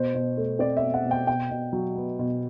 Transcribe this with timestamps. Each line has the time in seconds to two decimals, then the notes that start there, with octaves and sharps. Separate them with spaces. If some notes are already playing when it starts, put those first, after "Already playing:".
Already playing: B2 C5
0.15 B2
0.37 A3
0.59 C4 D5
0.77 E5
0.82 B2
0.94 F#5
1.05 B2
1.11 G5
1.27 B2 G5
1.51 B2
1.73 F#3
1.96 B3
2.19 B2